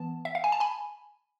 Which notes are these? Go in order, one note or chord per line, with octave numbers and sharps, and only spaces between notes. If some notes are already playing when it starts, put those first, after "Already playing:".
Already playing: E3 B3 A5
E5
F5
G#5
A5
G#5 B5